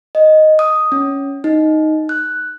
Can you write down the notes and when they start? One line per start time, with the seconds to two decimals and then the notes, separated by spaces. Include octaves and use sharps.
0.15 D#5
0.59 D#6
0.92 C#4
1.44 D#4
2.09 F#6